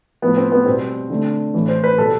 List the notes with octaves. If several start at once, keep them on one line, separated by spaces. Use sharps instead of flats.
A2 F3 A3 B3
C4
B3
B2 G3 C4
D3 A3
A2 E3 A3
C5
B4
B2 G3 A4